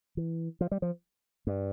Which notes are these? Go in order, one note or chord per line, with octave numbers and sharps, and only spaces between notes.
E3
F3
G3
F3
G2